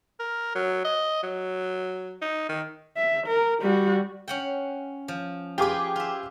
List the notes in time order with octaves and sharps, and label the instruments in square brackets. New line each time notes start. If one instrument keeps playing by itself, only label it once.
[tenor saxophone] A#4
F#3
D#5
F#3
D#4
D#3
[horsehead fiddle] E5
A#4
G3 F#4
[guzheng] C#4 F#5 G5
F3
[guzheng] F4 B4 [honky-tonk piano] G4 G#4 D6
[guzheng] F4 E5